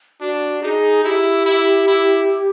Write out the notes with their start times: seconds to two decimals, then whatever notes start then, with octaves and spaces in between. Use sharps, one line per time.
0.21 D4 F#4
0.63 D#4 G#4
1.04 E4 G4
1.46 E4
1.88 E4